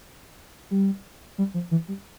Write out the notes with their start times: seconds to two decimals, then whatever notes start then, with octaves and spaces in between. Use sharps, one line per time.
0.71 G3
1.38 G3
1.54 F3
1.71 E3
1.88 G3